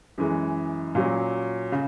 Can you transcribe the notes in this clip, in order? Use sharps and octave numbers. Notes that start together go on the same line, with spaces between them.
F#2 E3 G#3
A#2 F#3 C#4
C#3